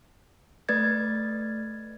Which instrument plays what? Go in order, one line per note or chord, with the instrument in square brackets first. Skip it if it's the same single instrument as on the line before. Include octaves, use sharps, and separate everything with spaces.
[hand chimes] A3 B4 D5 G#6 A6